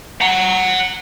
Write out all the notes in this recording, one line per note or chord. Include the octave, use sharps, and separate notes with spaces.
F#5 A#5